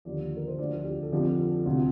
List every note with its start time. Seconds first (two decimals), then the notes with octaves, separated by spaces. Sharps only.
0.05 D#2 D3 F3 D5
0.37 A#4
0.47 C5
0.58 D2 D3 F3 D5
0.85 G4
1.02 A4
1.12 F2 D3 F3 G4
1.39 A4
1.66 D2 C3 F3